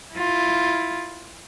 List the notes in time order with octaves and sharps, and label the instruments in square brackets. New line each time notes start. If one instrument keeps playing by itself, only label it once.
[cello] E4 F4